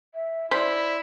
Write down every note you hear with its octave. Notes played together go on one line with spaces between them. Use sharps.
E5
E4 C5 D5 B5